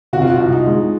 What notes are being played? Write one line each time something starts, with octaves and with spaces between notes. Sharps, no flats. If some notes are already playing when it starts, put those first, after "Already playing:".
C3 F#4
F4
F#4
C2
D#4
G#3